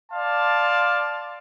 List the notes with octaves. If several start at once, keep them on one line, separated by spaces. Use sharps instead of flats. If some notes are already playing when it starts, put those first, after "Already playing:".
D5 F5 A5 C6